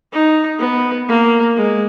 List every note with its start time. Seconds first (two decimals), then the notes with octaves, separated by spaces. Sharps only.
0.12 D#4
0.59 B3
1.08 A#3
1.57 G#3